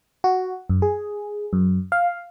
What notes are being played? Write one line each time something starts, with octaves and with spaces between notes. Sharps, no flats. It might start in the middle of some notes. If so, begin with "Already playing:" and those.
F#4
F#2
G#4
F#2
F5